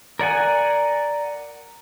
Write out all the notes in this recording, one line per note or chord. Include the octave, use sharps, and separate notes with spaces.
A#4 D5 F#5 G#5